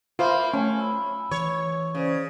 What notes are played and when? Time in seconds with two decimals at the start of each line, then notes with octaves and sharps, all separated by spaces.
0.19 A#3 F4 C5 E5 B5 C6
0.54 A3 C#4
0.79 B5 E6
1.31 E3 C#5
1.95 C#3 C#4 C5 D5